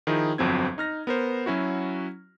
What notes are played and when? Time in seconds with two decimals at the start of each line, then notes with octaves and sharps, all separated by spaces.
0.07 D#3 F3 D#4 E4 G#4
0.38 G1 F2 F#3 C4 G#6
0.78 D#4 F6 A#6
1.07 B3 A#4 C5
1.46 F#3 C#4 E4 F#4